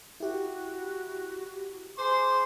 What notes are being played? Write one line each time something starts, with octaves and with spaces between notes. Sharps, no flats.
E4 F#4 G4
G#4 C5 C6 D6